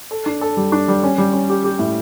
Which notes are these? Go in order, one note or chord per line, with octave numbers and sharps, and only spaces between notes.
A4
D4
A4
G3
D4
G3
C#4
G3
C#4
G4
G4
A2